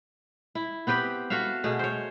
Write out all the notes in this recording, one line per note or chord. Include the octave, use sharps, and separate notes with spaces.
E4
B3 C4 G4 B4
F#4 A4 E5 F5
B2 A3 G#4
C5 C#5